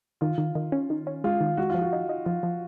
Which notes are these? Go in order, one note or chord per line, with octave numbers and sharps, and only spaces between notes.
D#3 F4
D#3
D#3
C#4
D#3
C#4
G#3 F4
D#3
G#3 F#4
F3 F4
F#4
D#4
D#4
F3 F4
F3